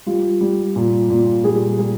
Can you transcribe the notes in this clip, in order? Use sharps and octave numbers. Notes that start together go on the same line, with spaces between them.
G3 F4
G3
A#2
A#2
G3 G#4
G3 G#4